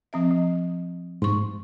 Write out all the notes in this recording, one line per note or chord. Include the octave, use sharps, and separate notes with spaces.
F3 C4 E5
F3
G#2 C6 C#6